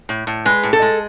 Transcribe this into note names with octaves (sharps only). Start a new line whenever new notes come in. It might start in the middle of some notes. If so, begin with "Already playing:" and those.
A2
A2
G#3 B4
A2
A4
G#3